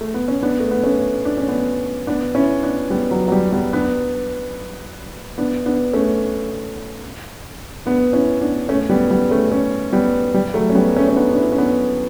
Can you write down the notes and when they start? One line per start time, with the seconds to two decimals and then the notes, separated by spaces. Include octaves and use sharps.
0.01 A3
0.14 B3
0.28 C#4
0.43 B3 D4
0.60 A3
0.71 B3
0.83 A3 C#4
1.25 D4
1.37 C#4
1.48 B3 D4
2.07 B3 D4
2.35 C#4 E4
2.63 B3 D4
2.90 G3 B3
3.11 F#3
3.28 F#3
3.32 G3
3.52 G3 B3
3.73 B3 D4
5.38 B3 D4
5.66 B3 D4
5.93 A3 C#4
7.86 B3 D4
8.13 C#4 E4
8.41 B3 D4
8.69 A3 C#4
8.90 G3 B3
9.10 G3 B3
9.30 A3 C#4
9.51 A3 C#4
9.92 G3 B3
10.34 G3
10.54 F#3 A3
10.70 C#4
10.75 G3 B3
10.96 A3 C#4
11.08 C#4
11.16 B3 D4
11.32 D4
11.37 C#4 E4
11.52 C#4
11.58 B3 D4